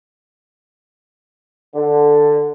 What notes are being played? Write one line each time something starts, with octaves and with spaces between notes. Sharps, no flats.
D3